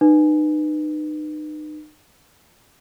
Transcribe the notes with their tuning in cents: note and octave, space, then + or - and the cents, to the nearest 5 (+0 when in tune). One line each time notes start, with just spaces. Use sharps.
D#4 -35 B4 +0